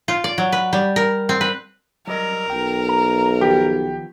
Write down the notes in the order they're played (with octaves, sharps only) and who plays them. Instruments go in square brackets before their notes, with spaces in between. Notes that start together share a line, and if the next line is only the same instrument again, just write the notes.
[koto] F4
D5
F#3
B4
G3
A#4
C4
B4
[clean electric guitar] F#3 G3 D#5 [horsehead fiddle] A#4
[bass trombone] B1 [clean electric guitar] G5
[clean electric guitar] A#5
[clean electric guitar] D#3 F3 B3 [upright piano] G4